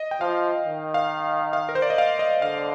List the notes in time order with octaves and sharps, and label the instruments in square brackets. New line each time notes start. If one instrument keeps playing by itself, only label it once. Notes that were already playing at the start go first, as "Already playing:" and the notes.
Already playing: [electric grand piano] D#5
G5
[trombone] F3 [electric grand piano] F5
[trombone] D#3
[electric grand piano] F5
F5
A#4
C5
D5
D#5
F5
D#5
[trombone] D3 [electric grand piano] F5